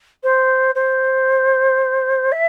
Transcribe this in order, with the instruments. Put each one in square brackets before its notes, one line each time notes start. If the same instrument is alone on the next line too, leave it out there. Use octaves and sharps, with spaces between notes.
[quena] C5
C5
E5